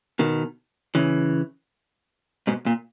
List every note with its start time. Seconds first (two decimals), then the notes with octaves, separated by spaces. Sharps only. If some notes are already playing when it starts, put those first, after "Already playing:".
0.19 B2 D#3
0.95 C#3 E3
2.47 G#2 B2
2.66 A#2